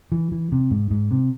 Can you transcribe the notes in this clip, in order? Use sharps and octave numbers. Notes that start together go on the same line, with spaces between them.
E3
E3
C3
G#2
G#2
C3